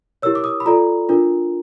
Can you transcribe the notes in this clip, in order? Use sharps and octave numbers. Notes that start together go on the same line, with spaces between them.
E4 G4 A#4 C#5 E6
D6
D#6
B5
F4 A4 D5 A#5
D4 F4 A#4